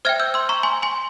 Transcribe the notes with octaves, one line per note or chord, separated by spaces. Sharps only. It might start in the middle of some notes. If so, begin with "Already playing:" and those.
C5 E5 G5 F6 G#6
E6 G6
C6 E6
A#5 C#6
G#5 C6
G#5 C6